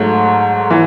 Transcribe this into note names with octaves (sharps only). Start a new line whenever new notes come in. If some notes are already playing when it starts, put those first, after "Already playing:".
Already playing: G#2 F#3 A3
E3